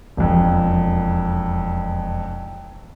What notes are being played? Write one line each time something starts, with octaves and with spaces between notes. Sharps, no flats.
E1 F2